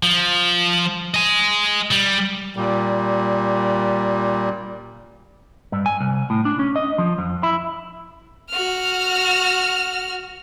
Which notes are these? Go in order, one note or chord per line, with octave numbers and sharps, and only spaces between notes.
F3
D#5 G#5
G3
A#2 G3
G2
G#5
C2
A2
D4
C#4
D#5
F3
F2
E4
F#4 F6